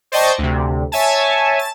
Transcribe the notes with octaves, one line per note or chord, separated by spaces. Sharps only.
C5 D5 D#5 G5 A5 C#6
D2 C3
C#5 E5 G#5 A5
A5